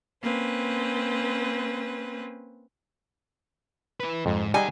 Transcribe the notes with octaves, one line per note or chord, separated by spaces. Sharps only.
A#3 C4 C#4 B4
E4 B4
F2 G#2
G3 G#3 D#4 D5 F#5 G#5